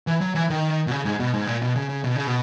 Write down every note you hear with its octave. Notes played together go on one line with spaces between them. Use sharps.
E3
F#3
E3
D#3
B2
C#3
G#2
B2
G#2
A#2
B2
C#3
C#3
B2
C#3
B2